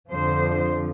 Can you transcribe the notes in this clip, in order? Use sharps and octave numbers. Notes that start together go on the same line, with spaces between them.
F2 D3 F3 C5